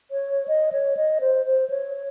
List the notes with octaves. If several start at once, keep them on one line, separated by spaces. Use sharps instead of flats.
C#5
D#5
C#5
D#5
C5
C5
C#5
C#5